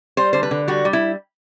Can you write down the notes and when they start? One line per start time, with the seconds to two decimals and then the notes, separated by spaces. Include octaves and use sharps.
0.17 G3 C5
0.33 D3 C5
0.43 B4
0.51 D3
0.68 G3 F#4
0.85 G3
0.93 E4